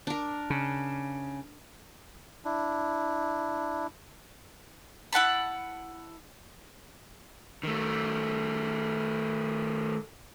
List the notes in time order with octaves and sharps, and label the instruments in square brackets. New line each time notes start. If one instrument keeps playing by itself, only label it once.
[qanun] D4 A#4
[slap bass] C#3
[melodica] D4 E4
[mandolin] E4 F#5 A5 B5
[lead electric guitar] D#3 A3